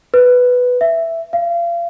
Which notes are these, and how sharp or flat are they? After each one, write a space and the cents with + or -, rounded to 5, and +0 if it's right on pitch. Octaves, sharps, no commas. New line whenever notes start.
B4 +5
E5 +5
F5 -30